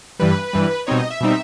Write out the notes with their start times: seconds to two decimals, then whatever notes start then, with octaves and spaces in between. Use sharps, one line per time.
0.19 G2 E3 G3 B4
0.53 G2 E3 G3
0.87 B2 G3 C4 D#4 C#5
0.98 D#5
1.10 E5
1.21 B2 G3 C4 D#4